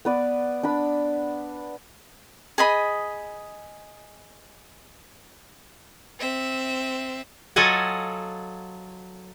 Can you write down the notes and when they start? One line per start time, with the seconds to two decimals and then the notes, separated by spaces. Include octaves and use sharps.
0.05 B3 B4 D5
0.63 D4 B5
2.58 G#4 D#5 B5
6.19 C4 E5
7.56 F#3 F4 A4 D#5 F#5 G#5